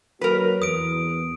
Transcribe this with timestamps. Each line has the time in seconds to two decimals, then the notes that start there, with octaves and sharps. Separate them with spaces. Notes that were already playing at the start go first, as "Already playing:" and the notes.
0.21 F#3 A#3 F#4 A#4 B4
0.62 E2 D#6 D7